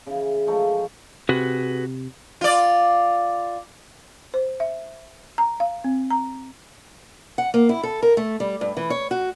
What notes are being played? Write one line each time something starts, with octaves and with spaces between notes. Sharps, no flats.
C#3 E3
F3 G#3 A3 A#4
C3 F#4 G#4 B4
F4 D5
C5
E5
A#5
F5
C4
A#5
F#5
A#3
E4
A4
A#4
A3
G3
G2
E3
C#5
F#4